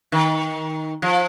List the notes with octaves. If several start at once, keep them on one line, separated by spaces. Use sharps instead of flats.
D#3
F3